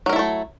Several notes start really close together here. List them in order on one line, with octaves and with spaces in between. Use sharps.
F#3 A#4 E4 A4 A3